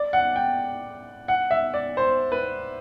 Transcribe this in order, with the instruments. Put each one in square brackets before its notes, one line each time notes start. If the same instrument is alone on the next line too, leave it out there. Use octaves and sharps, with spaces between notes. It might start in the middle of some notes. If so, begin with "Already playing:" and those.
Already playing: [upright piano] D5
F#5
G5
F#5
E5
D5
C5
B4